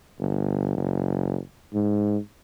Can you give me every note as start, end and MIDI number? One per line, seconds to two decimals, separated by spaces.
0.20 0.74 31
0.77 1.38 30
1.74 2.17 44